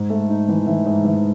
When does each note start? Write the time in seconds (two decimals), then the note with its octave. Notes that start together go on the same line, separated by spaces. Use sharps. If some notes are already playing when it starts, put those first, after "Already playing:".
Already playing: G#2
0.10 A3
0.29 D#4
0.49 E3
0.67 E3
0.86 G#2
1.04 E3